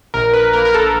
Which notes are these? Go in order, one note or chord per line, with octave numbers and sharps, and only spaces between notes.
A#1 A#4
B4
A#3 A#4
A#4
A4